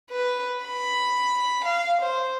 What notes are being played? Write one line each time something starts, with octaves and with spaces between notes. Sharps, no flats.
B4
B5
F5
C5